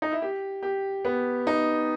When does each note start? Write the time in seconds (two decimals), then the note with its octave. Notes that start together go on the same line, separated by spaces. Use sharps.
0.02 D#4
0.12 E4
0.22 G4
0.63 G4
1.05 B3
1.47 D#4